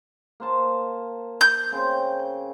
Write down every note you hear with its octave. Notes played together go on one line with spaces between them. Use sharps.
A#3 C5 A5
G6
C#3 C4